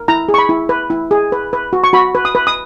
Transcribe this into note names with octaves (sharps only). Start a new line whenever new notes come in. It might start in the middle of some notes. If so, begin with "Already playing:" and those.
Already playing: A#4
E4 A#5
G#4
C#6
B5
E4
B4
E4
G#4
B4
B4
F#4
C#6
F#4 B5
B4
D#6
B4
D#6